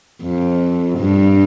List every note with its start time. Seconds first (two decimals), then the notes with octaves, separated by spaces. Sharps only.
0.22 F2
0.99 G2